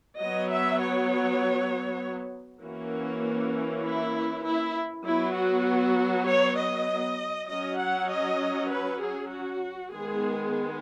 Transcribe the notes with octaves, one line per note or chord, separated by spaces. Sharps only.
F#3 B3 D#5
E5
C#5
E3 A#3 C#4 F#4
E4
E4
F#3 B3 E4
F#4
C#5
D#5
F#3 C#4 D#5
F#5
D#5
B4
G#4
F#4
D#3 G#3 B3 G#4